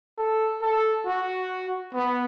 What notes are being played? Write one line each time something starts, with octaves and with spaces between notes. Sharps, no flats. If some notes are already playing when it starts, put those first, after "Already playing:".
A4
A4
F#4
B3